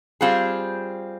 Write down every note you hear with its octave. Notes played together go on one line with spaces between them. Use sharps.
G3 C4 F4 G#4